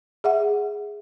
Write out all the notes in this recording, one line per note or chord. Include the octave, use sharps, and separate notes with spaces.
G#4 E5 F#5